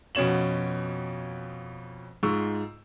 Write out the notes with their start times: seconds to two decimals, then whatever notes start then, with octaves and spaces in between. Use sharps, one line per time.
0.15 F2 B2 C#4 C#5 E7 F#7
2.23 G#2 G#3 F4 C#6 E6